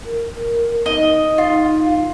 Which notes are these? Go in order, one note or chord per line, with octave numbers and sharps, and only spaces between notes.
A#4
D#4 D#5
F4